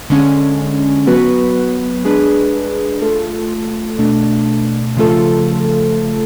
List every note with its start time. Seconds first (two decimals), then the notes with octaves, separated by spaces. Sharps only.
0.10 D3 G#3 C#4
1.07 F#3 B3 F#4 B4
2.04 G#3 D4 G#4 B4
3.01 A3 F4 A4
3.99 B2 A3 D4
4.97 C#3 F3 A3 F4 A4